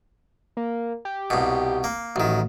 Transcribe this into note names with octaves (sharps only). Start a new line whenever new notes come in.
A#3
G4
C2 B2
A#3
A1 D#3 F#3